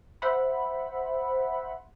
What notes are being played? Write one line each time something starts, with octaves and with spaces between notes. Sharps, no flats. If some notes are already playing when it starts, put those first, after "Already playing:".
C5 E5 F#5 B5